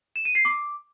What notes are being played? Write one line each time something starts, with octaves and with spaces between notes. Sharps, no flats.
E7
D#7
C7
D6